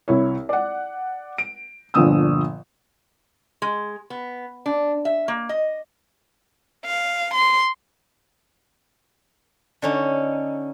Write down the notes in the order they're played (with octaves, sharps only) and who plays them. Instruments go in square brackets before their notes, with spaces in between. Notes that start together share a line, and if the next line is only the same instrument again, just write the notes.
[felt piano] C2 E4 C#5
D5 F#5
D7
G1 A#2 D3 F3 D#6 E6
[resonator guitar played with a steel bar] G#3
B3
D4
E5
A#3
D#5
[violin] F5
C6
[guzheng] D3 C#4 D#4